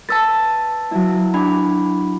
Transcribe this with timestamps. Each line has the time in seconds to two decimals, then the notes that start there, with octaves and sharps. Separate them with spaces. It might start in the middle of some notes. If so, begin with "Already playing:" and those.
0.09 B4 A5 E6 A6
0.91 F#3 E4
1.34 D4 G#5 B5 D6